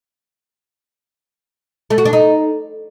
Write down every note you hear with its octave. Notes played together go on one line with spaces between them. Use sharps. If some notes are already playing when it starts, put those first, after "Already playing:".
A3
F#4
D4
D#4